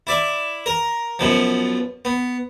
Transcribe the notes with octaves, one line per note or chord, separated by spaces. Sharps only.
E4 D5 E5
A#4
F#2 B2 F3
B3